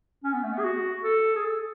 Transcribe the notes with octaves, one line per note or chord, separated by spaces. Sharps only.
C#4
B3
A3
B3
G#4
F#4
A4
G#4
A4